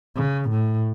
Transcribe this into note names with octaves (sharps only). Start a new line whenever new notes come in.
C#3
A2